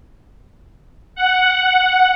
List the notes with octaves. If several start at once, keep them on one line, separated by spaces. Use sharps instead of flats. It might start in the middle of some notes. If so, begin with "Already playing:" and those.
F#5